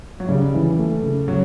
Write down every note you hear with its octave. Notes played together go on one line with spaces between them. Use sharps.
F#3
C#3 G3
E3
A3
C#3
C#3 F#3